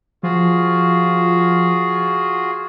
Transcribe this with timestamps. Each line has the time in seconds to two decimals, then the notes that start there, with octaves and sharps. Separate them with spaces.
0.23 F3 F4 F#4 G#4